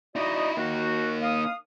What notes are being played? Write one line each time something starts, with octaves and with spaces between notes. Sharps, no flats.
D#4 E4 F#4 D5 D#5
A#3 D#4 F#4
F5 D#6